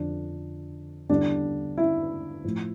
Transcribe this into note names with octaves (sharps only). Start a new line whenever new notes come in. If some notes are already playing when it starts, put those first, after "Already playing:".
Already playing: F2 D3 F3 D4
E2 D3 G3 D4
E4
A2 F3